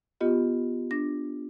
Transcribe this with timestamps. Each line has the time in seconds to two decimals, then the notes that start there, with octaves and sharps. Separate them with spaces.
0.21 B3 F4 G4 D#5
0.91 D4 A#6